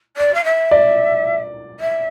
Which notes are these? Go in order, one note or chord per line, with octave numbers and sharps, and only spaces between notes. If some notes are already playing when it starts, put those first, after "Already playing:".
D5
F5
E5
D5
E5